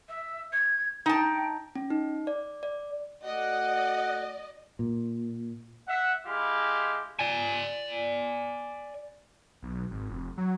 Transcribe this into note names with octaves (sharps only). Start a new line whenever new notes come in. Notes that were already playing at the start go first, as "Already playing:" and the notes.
E5
G#6
D#4 G5 A5
C#4
D#4
D5
D5
A3 F#4 D5 D#5 F#5
A#2
E5 F#5
G#3 E4 G4 F5
D5 G#5
B1
G#1
F1
F#3